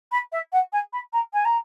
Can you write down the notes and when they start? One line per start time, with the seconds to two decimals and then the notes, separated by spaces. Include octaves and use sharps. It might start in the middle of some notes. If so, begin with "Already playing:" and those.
0.12 B5
0.32 E5
0.52 F#5
0.73 G#5
0.93 B5
1.13 A#5
1.33 G#5
1.45 A#5